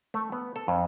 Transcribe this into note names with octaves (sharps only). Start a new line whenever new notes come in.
A3
B3
A4
F2